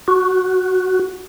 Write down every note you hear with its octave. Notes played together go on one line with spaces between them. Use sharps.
F#4